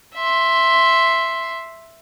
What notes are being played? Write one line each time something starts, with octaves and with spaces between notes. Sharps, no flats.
E5 C6